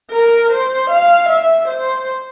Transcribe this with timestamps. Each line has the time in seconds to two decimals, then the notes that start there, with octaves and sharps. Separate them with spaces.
0.11 A#4
0.51 C5
0.90 F5
1.29 E5
1.68 C5